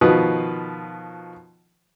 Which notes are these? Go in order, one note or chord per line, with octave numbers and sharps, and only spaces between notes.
B2 D#3 F3 B4 D#6